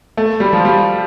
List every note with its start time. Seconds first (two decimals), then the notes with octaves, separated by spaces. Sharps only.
0.17 A3
0.40 G3
0.53 F3
0.65 G3